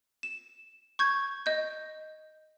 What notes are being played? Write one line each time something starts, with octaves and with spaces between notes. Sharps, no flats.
E7
C#6 G6 G#6
D#5 G6